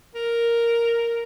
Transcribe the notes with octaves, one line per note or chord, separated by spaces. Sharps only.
A#4